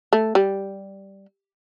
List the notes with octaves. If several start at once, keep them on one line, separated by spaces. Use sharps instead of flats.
A3
G3